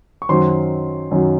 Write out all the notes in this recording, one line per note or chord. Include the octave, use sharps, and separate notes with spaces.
C#6
F#2 D#3 F#3 C5 C6
F#2 D#3 F#3